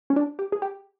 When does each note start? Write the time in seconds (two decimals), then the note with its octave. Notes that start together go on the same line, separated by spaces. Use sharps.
0.10 C#4
0.16 D4
0.39 G4
0.52 G#4
0.62 G4